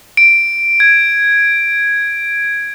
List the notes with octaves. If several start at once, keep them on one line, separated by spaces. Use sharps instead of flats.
D7
G#6